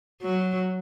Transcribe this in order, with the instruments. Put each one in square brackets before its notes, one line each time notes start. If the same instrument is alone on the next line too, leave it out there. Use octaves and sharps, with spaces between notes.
[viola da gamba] F#3